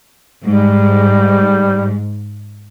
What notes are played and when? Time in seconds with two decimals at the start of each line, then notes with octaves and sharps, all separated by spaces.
0.45 G#2 G3